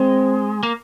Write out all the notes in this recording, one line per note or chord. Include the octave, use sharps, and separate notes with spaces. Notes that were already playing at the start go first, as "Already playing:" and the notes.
Already playing: G#3 C4
A#3